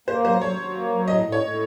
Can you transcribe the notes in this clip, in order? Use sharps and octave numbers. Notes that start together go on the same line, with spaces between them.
A#3 C5
F#3 C5
F#3 C#5
F#3
A#3
F#3
A2 D#5
A2
C#5
A2